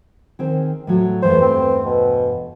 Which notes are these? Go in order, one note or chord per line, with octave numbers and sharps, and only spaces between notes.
D#3 C4 G#4
A2 F#3
E2 G2 A3 C5
C4
B2